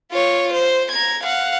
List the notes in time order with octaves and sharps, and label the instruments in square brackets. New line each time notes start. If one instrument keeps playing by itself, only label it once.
[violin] F4 C#5
C5
A#5 G#6
F5 F#5